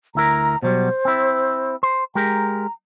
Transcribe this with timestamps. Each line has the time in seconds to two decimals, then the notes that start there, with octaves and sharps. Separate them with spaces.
0.15 D2 E4 A#4 A#5
0.62 B2 F#3 G3 C5
1.05 C4 E4
1.83 C5
2.15 G#3 G4 A#4 A#5